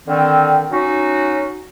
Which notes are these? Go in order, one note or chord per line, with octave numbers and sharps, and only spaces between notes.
D3 D#3 C4
F#3 C#4 D#4 F#4